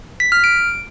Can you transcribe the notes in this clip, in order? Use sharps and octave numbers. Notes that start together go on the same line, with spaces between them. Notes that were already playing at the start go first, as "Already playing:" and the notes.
B6
F6
D7